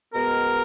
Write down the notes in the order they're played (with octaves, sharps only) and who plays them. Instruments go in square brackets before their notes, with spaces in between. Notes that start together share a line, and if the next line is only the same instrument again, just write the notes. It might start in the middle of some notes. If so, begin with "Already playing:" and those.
[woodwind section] B2 G#3 B3 A#4